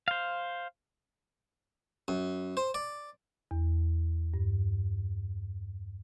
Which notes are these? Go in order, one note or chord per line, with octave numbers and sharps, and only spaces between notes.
C5 F5
F#2
C5
D5
E2
G2